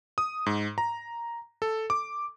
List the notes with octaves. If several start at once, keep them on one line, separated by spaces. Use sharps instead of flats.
D#6
G#2
A#5
A4
D6